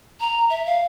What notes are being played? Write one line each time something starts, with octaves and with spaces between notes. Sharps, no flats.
A#5
E5
F5